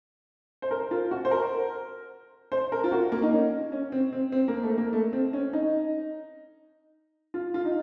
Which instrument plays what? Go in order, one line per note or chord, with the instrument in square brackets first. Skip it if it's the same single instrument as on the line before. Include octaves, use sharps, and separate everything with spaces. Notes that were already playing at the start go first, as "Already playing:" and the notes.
[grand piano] C5
A#4
F4
F#4
C5
A#4
C5
A#4
F4
F#4
A#3
D#4
C#4
C#4
C4
C4
C4
A#3
A3
A#3
A3
C4
C#4
D#4
F4
F4
D#4